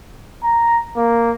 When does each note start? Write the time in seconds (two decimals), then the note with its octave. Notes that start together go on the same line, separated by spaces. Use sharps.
0.43 A#5
0.96 A#3